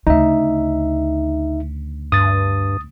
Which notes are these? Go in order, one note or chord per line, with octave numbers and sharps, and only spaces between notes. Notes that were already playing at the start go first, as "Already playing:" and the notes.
D2 C#3 D#4 E5
G2 D#6 A6